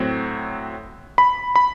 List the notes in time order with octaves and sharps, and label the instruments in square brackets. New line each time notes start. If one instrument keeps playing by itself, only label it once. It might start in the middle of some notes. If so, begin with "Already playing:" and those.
Already playing: [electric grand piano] A2 F#3 C4
B5
B5